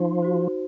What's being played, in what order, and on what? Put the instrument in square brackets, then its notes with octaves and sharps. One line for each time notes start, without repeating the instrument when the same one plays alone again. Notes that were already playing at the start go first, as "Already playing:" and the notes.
Already playing: [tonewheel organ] F3 [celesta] D#4
[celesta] F#4 C5